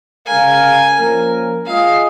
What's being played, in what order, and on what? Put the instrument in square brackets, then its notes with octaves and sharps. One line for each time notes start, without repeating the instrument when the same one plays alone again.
[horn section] C#3 G#3 C#4 A#4 F5 [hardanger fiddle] G#5
[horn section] F3 A#3 C#4 A#4
[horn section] G#3 F4 G#4 D#5 [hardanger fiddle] F5